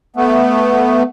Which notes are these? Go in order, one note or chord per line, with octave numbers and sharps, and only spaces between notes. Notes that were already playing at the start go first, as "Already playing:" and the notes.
A3 B3